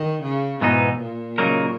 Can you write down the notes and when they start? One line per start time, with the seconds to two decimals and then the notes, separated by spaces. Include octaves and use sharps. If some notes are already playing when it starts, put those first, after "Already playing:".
Already playing: D#3
0.23 C#3
0.61 G#2 B2 E3 B3 D#4
0.99 A#2
1.38 C#3 F#3 A#3 D#4 A#4